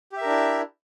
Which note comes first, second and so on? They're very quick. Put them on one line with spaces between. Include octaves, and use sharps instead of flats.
G4 E5 A#4 D4 E4